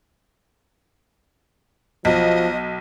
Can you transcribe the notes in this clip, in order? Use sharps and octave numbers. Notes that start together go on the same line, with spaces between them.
B1 F3 D#5